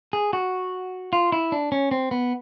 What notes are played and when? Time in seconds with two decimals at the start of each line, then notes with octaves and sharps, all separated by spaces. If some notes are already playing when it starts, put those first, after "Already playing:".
0.13 G#4
0.33 F#4
1.13 F4
1.32 E4
1.52 D4
1.72 C#4
1.91 C4
2.11 B3